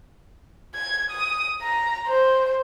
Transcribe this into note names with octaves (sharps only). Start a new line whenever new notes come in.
G#6
D#6
A#5
C5